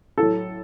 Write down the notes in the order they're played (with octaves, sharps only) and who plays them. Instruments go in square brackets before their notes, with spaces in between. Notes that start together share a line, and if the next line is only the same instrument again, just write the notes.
[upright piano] A2 F#3 A4